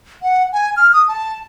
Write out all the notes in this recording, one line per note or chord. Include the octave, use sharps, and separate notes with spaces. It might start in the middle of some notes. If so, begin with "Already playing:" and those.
F#5
G#5
F6
D#6
A5